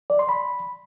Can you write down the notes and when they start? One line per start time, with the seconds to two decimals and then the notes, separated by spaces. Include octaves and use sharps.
0.10 D5
0.19 C6
0.29 B5